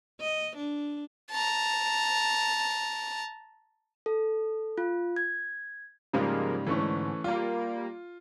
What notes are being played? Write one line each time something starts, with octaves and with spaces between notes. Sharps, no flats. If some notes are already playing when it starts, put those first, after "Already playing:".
D#5
D4
A5 A#5
A4
F4
G#6
G#2 C#3 F3 G3 G#3 A#3
G#2 D3 E3 A3 C#4
G3 A#3 F4